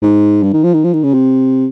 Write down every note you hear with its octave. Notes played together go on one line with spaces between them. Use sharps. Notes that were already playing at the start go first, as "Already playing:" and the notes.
G#2
G2
D#3
F3
D#3
F3
D#3
C#3
C3